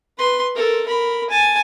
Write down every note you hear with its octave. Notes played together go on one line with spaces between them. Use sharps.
B4 C6
A4 A#4
A#4 B5
G#5 A5